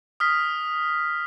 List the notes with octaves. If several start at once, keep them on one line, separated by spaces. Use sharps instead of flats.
D#6 F6 B6